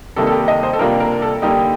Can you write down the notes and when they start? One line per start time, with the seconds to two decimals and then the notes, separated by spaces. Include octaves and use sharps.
0.16 C3 D#3 G3 A#3 D#4 A4
0.27 A4
0.32 G4
0.48 D#5
0.63 C5
0.73 A4
0.79 C3 G3 A#3 D4 F4 A#4
1.00 A#4
1.22 A4
1.42 D3 G3 A#3 D#4 G4